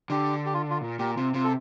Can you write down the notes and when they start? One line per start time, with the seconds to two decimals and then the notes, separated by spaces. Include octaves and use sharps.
0.10 D3 G4
0.46 G4
0.54 F4
0.70 F4
0.81 A#2
0.99 A#2 G4
1.17 C3 F4
1.34 C3 F4
1.44 A4